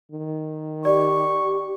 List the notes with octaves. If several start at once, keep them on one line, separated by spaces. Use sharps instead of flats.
D#3
G4 D5 C#6